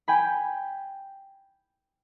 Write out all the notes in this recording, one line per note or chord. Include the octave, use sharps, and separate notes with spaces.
G5 G#5 B5